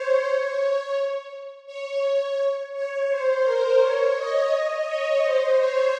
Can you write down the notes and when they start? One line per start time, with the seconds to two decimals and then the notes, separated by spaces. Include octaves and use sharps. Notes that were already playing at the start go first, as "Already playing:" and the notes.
Already playing: C5 C#5
1.66 C#5
2.73 C#5
3.09 C5
3.44 A#4
3.80 C#5
4.16 D#5
4.86 C#5
5.22 C5
5.59 C#5